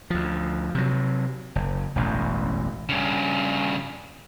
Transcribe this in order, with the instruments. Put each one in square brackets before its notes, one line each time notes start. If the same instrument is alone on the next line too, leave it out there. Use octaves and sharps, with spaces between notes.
[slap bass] D2 F3
C3 F#3
F#1
E1 A1 F#2
[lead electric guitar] G2 C#3